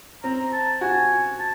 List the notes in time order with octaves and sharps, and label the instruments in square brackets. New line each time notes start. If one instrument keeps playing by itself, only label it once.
[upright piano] C4 [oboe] A#5
[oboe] A5
[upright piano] F#4 [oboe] G#5
[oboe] A5